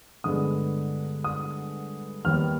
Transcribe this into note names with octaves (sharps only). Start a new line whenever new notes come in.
G2 D3 G#3 B3 D#6
D#6
D#2 D#3 G3 B3 F6